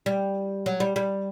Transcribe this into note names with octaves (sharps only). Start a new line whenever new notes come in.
G3
F#3
G3
G3